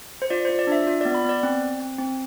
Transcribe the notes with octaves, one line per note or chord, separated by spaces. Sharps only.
C5
F4 D5
C5
F4
D5
D4 E5
F4
D5
B3
B5
B3 D5
C4
C4
C4
C4